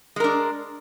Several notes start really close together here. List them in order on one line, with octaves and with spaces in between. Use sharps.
G#3 A#4 D4